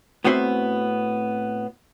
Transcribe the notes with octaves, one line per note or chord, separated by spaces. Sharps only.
A2 B3 C4 F#4 C5 E5